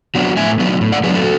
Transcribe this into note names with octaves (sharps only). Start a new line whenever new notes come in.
F#3 B3 D4
A2 E5 G#5
F#3 B3 D4
A2
D5 F#5
F#3 B3 D4 G#4 B4
F#4 A4